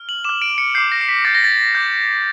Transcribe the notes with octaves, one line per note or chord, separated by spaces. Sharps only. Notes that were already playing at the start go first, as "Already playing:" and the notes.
Already playing: F6
F#7
D6 F6 E7
D7
C#7
D6 G6 C7
A#6
C7
B6
D6 G6 A6
A#6
A6
D6 G6